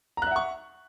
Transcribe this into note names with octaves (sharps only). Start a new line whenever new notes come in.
E5 F#5 A#5 C#6 F#6